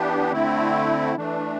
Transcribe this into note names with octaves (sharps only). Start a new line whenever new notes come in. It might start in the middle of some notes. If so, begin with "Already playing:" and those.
Already playing: E3 B3 D4 G4
D3 A3 C4 E4
E3 A3 D4